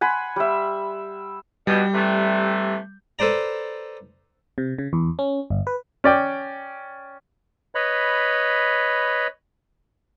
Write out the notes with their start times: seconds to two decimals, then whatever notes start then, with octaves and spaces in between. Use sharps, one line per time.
0.01 F#5 G#5 B5 C6
0.36 G3 E5
1.67 B2 G3 G6
1.93 C3 E3 A3
3.19 A4 B4 C5 D5 A#5
4.58 C3
4.78 C#3
4.93 E2
5.19 C#4
5.50 G1
5.67 B4
6.04 C#4 D5 G5
7.75 B4 C#5 D#5 B5